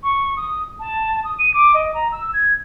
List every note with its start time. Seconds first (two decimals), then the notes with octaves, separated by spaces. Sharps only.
0.03 C#6
0.37 D#6
0.80 A5
1.24 D#6
1.39 D#7
1.54 D6
1.74 D#5
1.94 A#5
2.12 E6
2.33 G#6